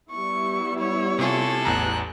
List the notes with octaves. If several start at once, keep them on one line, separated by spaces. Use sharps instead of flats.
G3 B3 E4 C#6
C#5
C3 F4 G#4 A4
A1 E2 A#5 F#6